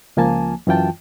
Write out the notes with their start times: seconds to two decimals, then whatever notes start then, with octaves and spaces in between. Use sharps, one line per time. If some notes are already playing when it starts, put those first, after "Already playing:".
0.17 C#2 F3 A#3 G#5 A5
0.67 F#2 E3 F4 G5 A5